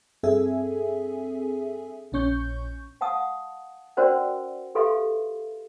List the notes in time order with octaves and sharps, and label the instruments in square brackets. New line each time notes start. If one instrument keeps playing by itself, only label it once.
[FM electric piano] G2 C4 G#4 A4 E5 G#5
A#1 A#2 C#4 C#6 G6
[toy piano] F5 F#5 A5 D#6
C#4 F#4 A#4 C5 D5 F#5
G4 A4 B4 E5 F5 C6